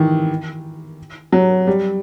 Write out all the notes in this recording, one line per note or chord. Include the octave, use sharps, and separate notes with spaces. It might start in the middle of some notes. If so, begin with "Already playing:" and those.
Already playing: D#3 E3
F#3
G3